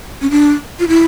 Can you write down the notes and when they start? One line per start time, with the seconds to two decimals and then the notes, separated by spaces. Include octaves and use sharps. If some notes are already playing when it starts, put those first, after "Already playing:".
0.22 C#4
0.31 D4
0.80 F4
0.88 E4